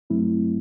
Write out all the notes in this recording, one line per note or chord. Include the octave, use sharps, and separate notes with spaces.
G2 F#3 A3 C4 E4